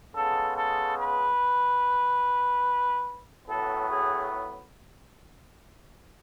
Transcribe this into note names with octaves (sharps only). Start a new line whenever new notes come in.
C#3 G#3 B3 A4
A4
B4
A2 F#3 B3 A4
G#4